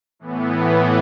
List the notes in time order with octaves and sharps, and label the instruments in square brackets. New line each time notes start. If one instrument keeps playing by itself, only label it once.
[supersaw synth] A2 E3 B3